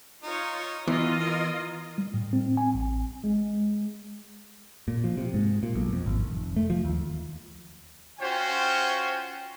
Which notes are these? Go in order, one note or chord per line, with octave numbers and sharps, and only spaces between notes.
D#4 F4 C#5
E3 B3 F4 D#5
A#4
G3
A2
C4
G#5
A1
G#3
A#2
F3
C3
G#2
A#2
B1
F2
G#1
F1
A3
F3
D#2
C#4 F4 F#4 C5 G5